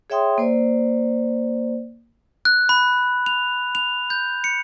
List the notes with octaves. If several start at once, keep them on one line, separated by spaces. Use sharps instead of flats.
G#4 C#5 E5 G5 C6 D#6
A#3 C5 D5
F#6
B5
F7
F7
G6
C#7